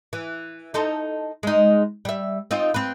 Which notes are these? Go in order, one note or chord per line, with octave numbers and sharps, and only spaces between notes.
E3
D#4 A4 C5
G#3 D#4
G3 E5
C4 D#4 F4
C4 B4